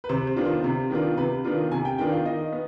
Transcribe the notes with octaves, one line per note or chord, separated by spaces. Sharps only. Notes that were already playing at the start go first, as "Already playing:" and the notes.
B4
C3 C5
C5
D#3 B3 D4 F4
C5
C3
D#3 B3 D4 F4
C3 B4
D#3 B3 D4 F4
C3 G#5
G5
D#3 B3 D4 F4 G5
F5
D#3 D#5
B3